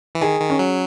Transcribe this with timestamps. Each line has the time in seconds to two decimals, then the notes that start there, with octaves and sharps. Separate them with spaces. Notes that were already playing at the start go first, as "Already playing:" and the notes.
0.15 E3
0.21 D#3 G#4
0.40 D#3
0.50 C#4
0.59 F#3